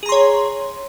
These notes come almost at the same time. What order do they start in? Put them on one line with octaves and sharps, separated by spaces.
G#4 A#5 C6 C#5